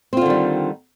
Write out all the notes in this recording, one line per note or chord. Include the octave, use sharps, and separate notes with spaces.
D3 D#3 G3 C4 F4